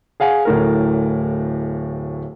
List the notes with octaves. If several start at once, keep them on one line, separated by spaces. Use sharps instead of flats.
G#4 F5 F#5 G#5
D1 A2 A#4